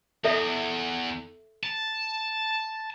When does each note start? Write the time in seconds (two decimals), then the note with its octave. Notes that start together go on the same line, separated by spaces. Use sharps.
0.24 E2 A4 E5
1.64 A5